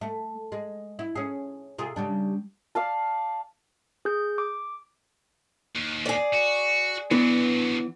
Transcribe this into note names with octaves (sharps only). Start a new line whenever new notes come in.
A3
G#3
E4
C#4 G#4
C3 F4 G#4
C#3 G3 D4
D5 F5 A5
G#4 G6
D6
D#2
G#4 D5
F#4
D3 E3 F#3 B3